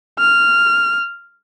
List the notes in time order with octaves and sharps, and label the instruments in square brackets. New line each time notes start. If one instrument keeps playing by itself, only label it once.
[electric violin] F6